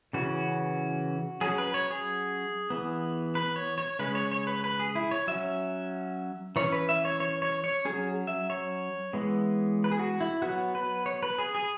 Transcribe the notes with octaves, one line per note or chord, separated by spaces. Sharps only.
C#3 E3 C#4 F#4
F#3 C#4 G#4
B4
C#5
G#4
E3 B3
B4
C#5
C#5
C#3 G#3 C#4 B4
C#5
C#5
B4
B4
G#4
E4
C#5
F#3 C#4 E5
E3 C#4 C#5
B4
E5
C#5
C#5
C#5
C#5
F#3 C#4 G#4
E5
C#5
E3 G#3 B3
B4
G#4
F#4
E4
F#3 B3 F#4
B4
C#5
B4
G#4
G#4